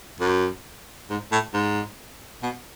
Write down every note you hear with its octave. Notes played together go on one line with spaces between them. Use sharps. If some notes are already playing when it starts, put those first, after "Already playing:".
F#2
G#2
A2
G#2
B2